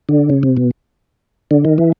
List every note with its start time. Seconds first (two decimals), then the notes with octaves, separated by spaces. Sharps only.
0.09 D3
0.29 C#3
0.43 C3
0.57 B2
1.51 D3
1.65 D#3
1.78 E3